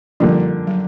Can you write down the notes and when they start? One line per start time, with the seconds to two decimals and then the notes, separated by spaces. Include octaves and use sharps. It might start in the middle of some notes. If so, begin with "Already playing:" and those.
0.20 D3 F3 G3 A#3 D4 F4
0.67 F#3